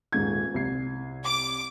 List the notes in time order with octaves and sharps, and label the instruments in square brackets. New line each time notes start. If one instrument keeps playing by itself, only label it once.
[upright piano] D#1 G#2 G#6
C2 C7
[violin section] D6